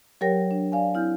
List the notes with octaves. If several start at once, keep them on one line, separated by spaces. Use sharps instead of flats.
F#3 G4 A#4 C#5 G5 A#6
D4
D5 F5 G#5
C4 E4 F6 G6